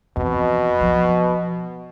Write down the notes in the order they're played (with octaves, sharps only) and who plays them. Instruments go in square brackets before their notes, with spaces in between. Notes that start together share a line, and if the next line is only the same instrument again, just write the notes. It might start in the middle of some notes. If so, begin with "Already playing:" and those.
[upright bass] F2 E3 [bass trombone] B2
[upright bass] F3